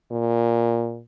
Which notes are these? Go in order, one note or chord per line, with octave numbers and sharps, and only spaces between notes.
A#2